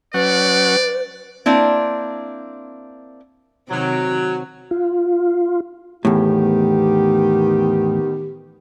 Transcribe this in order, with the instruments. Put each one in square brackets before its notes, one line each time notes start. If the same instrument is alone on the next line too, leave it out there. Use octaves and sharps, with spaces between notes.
[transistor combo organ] F#3 C#4 F#5 [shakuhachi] B4 [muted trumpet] D5
[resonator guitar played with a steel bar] A#3 C4 D4 E4
[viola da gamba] C3 D#3 C4 [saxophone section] F#3
[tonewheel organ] F4
[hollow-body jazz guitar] E2 A2 [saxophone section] D#3 B3 G4